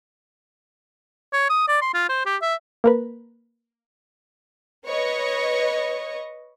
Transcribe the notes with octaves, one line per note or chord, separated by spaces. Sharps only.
C#5
D#6
D5
C6
F4
C5
G4
E5
A#3 A#4 B4
B4 C#5 D#5 C#6